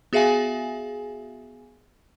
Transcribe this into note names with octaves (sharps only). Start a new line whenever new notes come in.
B3 F#4 G#4 E5 F5 G#5